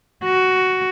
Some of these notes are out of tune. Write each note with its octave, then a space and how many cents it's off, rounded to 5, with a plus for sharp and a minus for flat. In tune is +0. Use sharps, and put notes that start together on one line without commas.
F#4 +10